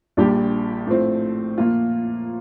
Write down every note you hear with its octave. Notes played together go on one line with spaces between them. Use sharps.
A#1 A#2 G3 D4 G4
A2 F3 C4
A#2 F3 A#3 F4